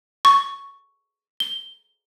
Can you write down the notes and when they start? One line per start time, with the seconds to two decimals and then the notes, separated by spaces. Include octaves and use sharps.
0.25 C#6
1.40 G7